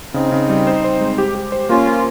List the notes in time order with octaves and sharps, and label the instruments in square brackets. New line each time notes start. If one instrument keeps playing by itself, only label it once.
[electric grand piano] C#3 [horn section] C4 D#4
[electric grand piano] C#3
G3
C5
C5
G#3
G4
G4
C5
[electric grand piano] A#3 [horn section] C#4 F4
[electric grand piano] A#4